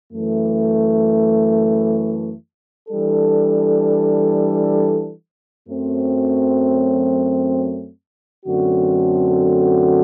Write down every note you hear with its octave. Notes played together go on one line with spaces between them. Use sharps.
F#2 E3 A3
E3 G3 D4 A4
F#2 F#3 A3 C4
F#2 D3 A3 C4 F#4